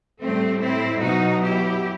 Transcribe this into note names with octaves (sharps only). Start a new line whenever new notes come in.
A2 G3 A3 C4
C4 E4
B2 F#3 D#4 F#4
E4 G4